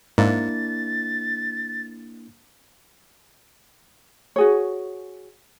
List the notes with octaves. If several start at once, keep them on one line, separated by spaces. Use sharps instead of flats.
G#2 A#3 D4 E4 A6
F#4 G#4 C#5